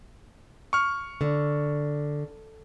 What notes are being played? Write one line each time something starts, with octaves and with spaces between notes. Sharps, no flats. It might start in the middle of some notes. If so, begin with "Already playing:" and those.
C#6 F6
D3